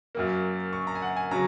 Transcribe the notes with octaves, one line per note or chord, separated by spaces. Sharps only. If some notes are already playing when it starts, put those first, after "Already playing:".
F#2 F#3 A#3
C#6
A#5
G#5
F#5
G#5
C#3 F#3 A#5